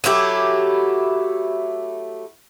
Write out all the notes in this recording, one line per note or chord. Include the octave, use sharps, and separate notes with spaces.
F#3 A3 E4 G4